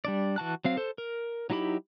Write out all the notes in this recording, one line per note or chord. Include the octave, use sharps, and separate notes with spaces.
G3 D4 D5
E3 F#4 A5 F#6
F#3 C4 F5
A4 C5
A#4
F#3 D#4 E4 G4 B5